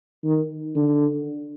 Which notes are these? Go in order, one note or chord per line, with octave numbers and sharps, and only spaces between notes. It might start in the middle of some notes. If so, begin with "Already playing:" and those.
D#3
D3